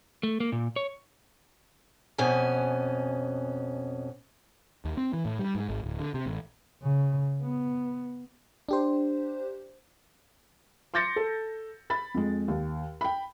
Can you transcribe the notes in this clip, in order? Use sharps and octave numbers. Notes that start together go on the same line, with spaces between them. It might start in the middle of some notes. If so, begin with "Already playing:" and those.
A3
A#3
A#2
C#5
F2 B2 C#4 G#5
D#2
C4
E3
A2
G3
G#2
G#1
D1
D3
C3
A1
C#3
B3
D4 G4 C5
C6 D6 G6 A6 A#6 C#7
A4
B5 A6
F2 G#3
D#2
G5 B5